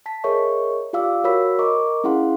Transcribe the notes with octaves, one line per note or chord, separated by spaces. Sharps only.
A5 B6
G#4 A#4 C#5 D#5 E5 C#6
F4 G4 D5 F5 D6 E6
F#4 A#4 C#5 B5 E6 B6
A#4 D#5 A#5 C#6 D6
C#4 E4 G#4 F5 F#5 C6